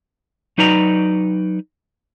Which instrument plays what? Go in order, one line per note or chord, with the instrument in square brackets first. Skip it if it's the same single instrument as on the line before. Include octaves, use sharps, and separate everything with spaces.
[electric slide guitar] F#3 D#4 B4 D5 A#5